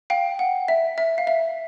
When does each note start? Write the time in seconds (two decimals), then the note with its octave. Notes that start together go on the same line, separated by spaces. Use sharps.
0.10 F5 G5
0.39 F#5
0.68 E5
0.98 E5
1.18 F5
1.27 E5